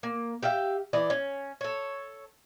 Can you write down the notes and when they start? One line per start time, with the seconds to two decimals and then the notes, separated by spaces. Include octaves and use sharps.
0.03 A#3
0.43 G4 E5 F5 G5
0.93 E3 D5 D#5
1.10 C#4
1.61 A4 C#5